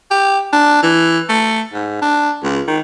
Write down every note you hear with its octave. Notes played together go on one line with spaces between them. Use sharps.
G4
D4
E3
A3
G#2
D4
C#2
D#3